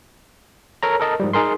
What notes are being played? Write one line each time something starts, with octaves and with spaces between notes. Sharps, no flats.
A4 A#4 C#5 A#5
A4 A#4 D#5 A5
G#2 F3 G3
D#4 G#4 A#4 C6